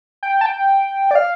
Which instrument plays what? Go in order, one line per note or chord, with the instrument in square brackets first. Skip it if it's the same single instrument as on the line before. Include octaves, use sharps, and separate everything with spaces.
[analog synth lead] G5
A5
G5
D5
F5